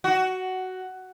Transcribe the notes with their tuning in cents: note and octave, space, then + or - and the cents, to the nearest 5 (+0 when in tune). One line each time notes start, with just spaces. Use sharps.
F#4 +10